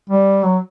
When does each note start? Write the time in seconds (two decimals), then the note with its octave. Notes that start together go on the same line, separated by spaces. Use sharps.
0.10 G3
0.44 F#3